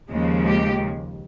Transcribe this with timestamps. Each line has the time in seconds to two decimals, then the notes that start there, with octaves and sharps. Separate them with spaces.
0.10 D#2 C#3 F3 G#3
0.47 G4